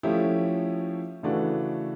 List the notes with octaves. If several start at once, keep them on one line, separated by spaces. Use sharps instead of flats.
F3 A3 C#4 E4 G4
C#3 E3 A3 D4 F#4